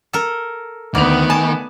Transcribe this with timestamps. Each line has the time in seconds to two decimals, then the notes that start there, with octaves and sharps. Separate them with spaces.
0.13 A4 A#4
0.95 D2 D#3 A3 B3 D5 F7
1.30 G#5 A5